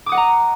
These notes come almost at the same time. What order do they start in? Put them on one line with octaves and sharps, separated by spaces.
D6 D#6 F#5 D#5 A#5